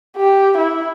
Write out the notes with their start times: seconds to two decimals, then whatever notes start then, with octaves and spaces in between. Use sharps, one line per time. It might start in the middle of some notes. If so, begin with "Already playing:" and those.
0.17 G4
0.57 E4